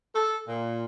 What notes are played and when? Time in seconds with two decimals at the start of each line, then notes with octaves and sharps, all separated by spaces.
0.15 A4
0.47 A#2